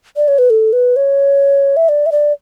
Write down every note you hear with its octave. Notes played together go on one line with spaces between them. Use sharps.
D5
C#5
B4
A4
B4
C#5
E5
D5
E5
D5